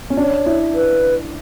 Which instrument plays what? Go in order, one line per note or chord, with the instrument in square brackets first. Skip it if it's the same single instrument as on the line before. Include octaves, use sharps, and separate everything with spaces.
[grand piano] C#4
[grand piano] D4 [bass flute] C#5
[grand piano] E4
[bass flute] B4